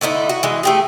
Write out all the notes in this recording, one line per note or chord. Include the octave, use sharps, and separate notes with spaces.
D3 A3 D#4 E4
F#4
E3 G#3
A3 G4 G#4